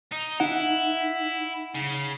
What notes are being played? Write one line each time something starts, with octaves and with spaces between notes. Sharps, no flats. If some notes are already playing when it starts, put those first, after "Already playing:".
D#4
D#4 E4 F#5
C#3